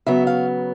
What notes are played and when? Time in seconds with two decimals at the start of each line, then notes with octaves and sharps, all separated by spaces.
0.06 C#3 F#3 B3 E5
0.27 F5